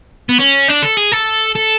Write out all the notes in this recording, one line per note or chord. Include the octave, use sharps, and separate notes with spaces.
B3
C#4
D4
A4
G#4
A4
A4